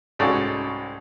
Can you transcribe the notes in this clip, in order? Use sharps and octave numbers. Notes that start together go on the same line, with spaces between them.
C2 G#2 C#4 F#4 A4 D5